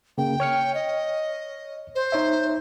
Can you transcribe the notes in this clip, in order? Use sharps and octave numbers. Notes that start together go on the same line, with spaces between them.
C#3 A#3 G5
C#5 F6 C#7
D#5
C5
D#4 C#5 E5